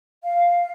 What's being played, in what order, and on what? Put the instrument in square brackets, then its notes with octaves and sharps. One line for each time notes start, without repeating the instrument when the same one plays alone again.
[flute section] F5